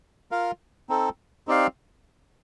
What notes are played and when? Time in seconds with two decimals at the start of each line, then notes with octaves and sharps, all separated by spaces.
0.31 F4 A#4 F5
0.89 C4 D#4 A4
1.47 C4 D#4 G4 D5 F5